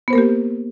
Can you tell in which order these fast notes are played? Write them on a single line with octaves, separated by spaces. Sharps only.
B3 C5 A#4 A#3 G4